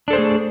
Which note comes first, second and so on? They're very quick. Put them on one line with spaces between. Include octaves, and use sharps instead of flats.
D4 A4 C5 G#4 A3